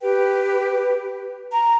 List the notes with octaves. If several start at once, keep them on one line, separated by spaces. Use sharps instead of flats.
G4 B4 G5
A#5